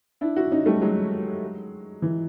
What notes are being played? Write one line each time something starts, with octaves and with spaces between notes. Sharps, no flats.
D4 E4
E4 F#4
C#4 D#4
G3 A3
F#3 G#3
E3